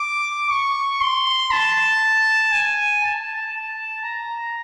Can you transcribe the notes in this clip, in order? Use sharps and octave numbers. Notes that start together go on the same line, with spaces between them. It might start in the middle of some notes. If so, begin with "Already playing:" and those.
Already playing: D6
C#6
C6
A5
G#5
A5
A5
A#5